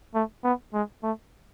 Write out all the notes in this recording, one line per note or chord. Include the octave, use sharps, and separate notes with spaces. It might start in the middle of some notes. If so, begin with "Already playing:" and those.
A3
B3
G#3
A3